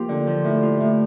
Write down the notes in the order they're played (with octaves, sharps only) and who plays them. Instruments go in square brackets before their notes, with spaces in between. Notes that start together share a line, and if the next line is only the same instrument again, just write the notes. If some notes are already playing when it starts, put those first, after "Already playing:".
Already playing: [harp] F3 A#3 F4 [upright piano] G4
[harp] D3
F3
A2
F4
A2